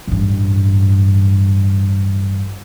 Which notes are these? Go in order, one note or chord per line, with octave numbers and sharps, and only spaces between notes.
A1 G2